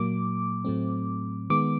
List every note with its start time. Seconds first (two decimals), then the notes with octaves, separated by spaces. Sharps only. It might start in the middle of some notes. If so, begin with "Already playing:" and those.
Already playing: A#2 F#3 A#3 D6
0.65 A2 F#3 A3 C4
1.50 D#3 G#3 B3 D6